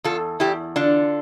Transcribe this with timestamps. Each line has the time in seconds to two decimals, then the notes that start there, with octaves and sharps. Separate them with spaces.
0.04 E2 F4 A4
0.40 E2 E4 G4
0.76 D3 D4 F4